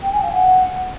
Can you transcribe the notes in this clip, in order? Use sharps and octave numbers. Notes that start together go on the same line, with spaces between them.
G5
G#5
F5
F#5